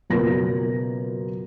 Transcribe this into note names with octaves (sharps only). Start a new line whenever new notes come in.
F#1 B2 F4 A#4 A#6